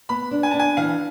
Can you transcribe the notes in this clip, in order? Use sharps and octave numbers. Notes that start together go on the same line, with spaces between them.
B3 B5
D4
G#5
D4 A5
G#5
E3 F5